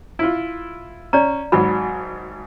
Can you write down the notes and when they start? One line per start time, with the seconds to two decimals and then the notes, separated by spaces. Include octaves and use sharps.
0.19 E4 F4
1.13 C#4 D5 A#5
1.52 G#1 G#2 F#3 B5